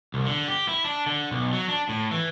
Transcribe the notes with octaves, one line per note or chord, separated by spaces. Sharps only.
C2
D3
G4
E4
D4
D3
B1
F#3
D4
A2
E3